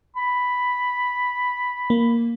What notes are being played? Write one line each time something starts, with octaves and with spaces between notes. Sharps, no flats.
B5
A#3